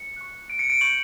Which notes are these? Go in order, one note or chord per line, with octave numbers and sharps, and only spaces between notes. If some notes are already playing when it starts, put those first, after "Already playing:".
Already playing: C#7
C#6 F#6
D7
C#7
D7
C#6 G6 F#7